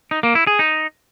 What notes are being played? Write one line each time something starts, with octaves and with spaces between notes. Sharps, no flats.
D#4
A#3
E4
G#4
D#4